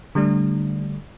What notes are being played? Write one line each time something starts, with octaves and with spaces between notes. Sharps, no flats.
D3 G3 A3 D4